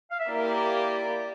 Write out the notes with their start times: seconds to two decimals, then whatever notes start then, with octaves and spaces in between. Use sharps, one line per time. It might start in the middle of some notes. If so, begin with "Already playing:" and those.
0.10 F5
0.19 E5
0.27 A#3 E4 G4 A#4 D5